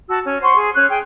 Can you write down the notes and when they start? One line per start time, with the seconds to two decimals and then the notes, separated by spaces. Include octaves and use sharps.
0.09 F#4 A5 E6
0.26 C#4
0.43 C5 F#5 C6 C#6
0.56 G#4
0.75 C#4 F#6
0.89 G#4 G5